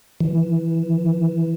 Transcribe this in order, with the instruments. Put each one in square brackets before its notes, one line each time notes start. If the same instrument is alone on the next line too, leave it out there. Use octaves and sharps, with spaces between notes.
[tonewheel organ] E3